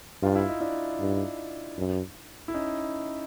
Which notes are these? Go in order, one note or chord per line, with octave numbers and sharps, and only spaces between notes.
G2 F4
E4
D#4
D4 E4
G2
F#2
E4
C#4 D#4